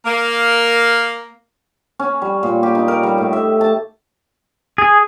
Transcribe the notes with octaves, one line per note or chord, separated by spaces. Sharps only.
A#3
C#4
G3
A#2
G4
D#4
A#4
G3
A2
E5
A5
G#4